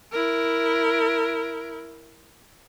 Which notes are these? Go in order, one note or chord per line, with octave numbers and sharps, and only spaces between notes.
E4 A#4